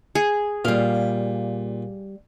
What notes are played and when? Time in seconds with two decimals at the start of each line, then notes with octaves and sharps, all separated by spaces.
0.15 G#4
0.65 A#2 G3 F5